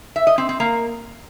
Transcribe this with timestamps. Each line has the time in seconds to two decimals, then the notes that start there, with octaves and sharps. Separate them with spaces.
0.16 E5
0.27 D#5
0.38 C4
0.49 C4
0.60 A#3